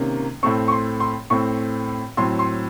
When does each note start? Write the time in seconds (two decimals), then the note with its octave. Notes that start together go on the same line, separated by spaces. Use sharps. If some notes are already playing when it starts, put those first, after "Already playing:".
Already playing: C3 D#3 A#3 C#4
0.43 A2 A3 C4 C#6
0.68 C#6
0.72 C6
1.00 C6
1.30 A2 A3 C4 C#6
2.17 A2 F#3 C4 C6
2.39 C6